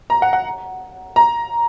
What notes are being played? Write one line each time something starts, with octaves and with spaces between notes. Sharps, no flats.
A#5
F#5
F#5
A#5